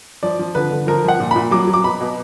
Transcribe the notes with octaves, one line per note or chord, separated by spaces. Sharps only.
F3 D5
F3
D3 B4
D3
F3 A#4
F3 F#5
A#2
A#2 B5
F#3 D6
F#3
D6
B2 B5
B2